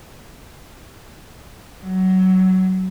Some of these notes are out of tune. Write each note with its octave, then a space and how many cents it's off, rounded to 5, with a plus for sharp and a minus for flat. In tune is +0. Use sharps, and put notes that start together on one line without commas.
F#3 +15